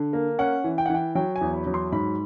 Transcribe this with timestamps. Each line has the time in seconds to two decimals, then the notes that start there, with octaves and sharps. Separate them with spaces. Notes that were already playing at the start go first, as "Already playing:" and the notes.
Already playing: D3
0.13 A#3
0.38 C#4 F#5
0.64 E3
0.78 G5
0.86 F#5
0.90 E3 G5
1.15 F#3 G5
1.36 G#5
1.41 E2
1.54 B5
1.67 F#3
1.74 C6
1.92 G#2 B5